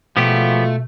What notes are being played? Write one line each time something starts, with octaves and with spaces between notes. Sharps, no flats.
B2 F3 F#3 G#3 A3 B3 F4 G4